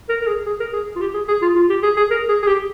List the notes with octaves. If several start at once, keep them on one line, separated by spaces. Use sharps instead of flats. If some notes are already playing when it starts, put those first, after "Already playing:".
A#4
A#4
G#4
G#4
A#4
G#4
F4
G4
G#4
G#4
F4
F4
G4
G#4
G#4
A#4
G#4
G#4
G4